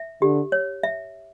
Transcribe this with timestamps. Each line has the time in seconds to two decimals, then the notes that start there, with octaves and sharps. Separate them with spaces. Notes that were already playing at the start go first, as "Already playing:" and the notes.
Already playing: E5
0.22 D3 G4
0.52 C#5
0.83 E5